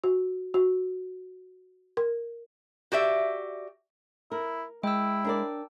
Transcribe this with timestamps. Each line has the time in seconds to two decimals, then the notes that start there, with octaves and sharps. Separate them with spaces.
0.04 F#4
0.54 F#4
1.97 A#4
2.92 F#4 G4 D5 E5
4.32 E4 A#4
4.83 G#3 E4 G5 E6
5.24 D4 A#4 D5